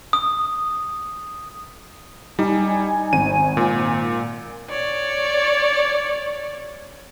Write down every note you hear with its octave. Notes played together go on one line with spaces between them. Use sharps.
D#6
G3 D#4 G#5
G#1 D#7
A#2
C#5 D5